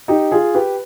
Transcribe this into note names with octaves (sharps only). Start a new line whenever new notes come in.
D#4 G4
F4 G#4
G4 B4